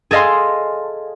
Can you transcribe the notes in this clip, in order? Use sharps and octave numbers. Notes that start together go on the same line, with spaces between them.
G#4 A4 D#5 F5 C6